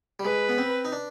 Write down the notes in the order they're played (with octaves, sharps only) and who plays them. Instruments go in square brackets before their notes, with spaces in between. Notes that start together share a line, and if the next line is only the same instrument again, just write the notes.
[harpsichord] G3
[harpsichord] G#3 [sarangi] B4
[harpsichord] B3
C4
D#4
D4